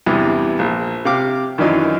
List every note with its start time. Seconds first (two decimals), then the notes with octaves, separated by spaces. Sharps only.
0.06 E2 G2 C3 E3
0.59 A#1
1.05 C3 F5 D6
1.58 F#2 D#3 E3 D4 D#4 F4